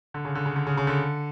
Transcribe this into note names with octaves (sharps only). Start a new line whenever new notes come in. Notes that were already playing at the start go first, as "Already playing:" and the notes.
D3
C#3
D3
C#3
D3
C#3
C#3
D3